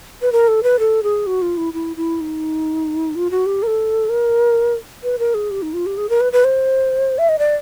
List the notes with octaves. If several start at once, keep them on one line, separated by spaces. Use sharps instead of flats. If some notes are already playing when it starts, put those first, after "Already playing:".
B4
A#4
A4
B4
A4
G#4
F#4
F4
E4
E4
E4
D#4
F4
F#4
G4
A#4
A4
A#4
B4
A#4
G#4
G4
D#4
F4
G4
G#4
A#4
B4
B4
C5
E5
D#5
D5